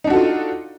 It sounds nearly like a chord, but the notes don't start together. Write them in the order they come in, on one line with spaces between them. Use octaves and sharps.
D#4 D4 F#4 A4 F4